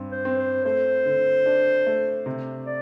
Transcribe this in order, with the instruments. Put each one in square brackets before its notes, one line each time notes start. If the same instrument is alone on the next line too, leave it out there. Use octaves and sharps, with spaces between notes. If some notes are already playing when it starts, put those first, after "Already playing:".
Already playing: [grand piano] G2 C4
[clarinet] C5
[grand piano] C4
[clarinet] C5
[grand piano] A3 [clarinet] C5
[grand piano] D3
D4
A3
C3
[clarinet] D5